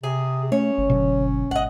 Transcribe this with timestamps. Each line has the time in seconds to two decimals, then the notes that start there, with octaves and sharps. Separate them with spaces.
0.04 C3 G#4
0.52 A3 C#4 C#5
0.78 G1
0.90 B2 D3 F#3
1.51 G#1 D#5 F#5